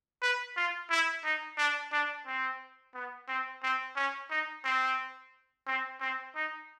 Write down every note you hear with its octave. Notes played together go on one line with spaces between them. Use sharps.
B4
F4
E4
D#4
D4
D4
C4
B3
C4
C4
C#4
D#4
C4
C4
C4
D#4